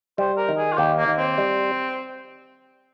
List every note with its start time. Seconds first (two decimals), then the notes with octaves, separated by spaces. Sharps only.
0.18 G3 C5
0.37 A#4
0.48 D#3
0.57 G#4
0.72 F4
0.78 D#2 G4
0.97 A#3
1.08 D#2
1.18 C4
1.38 G3